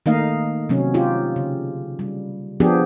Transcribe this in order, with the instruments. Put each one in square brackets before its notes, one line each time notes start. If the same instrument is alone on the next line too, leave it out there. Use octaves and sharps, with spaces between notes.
[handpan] D#3 A3 A#3 D#4 D#5 F5
C3 F#3 C#4
D#4 F4 G4
C#3
G3
F3 B3 D4 G4 G#4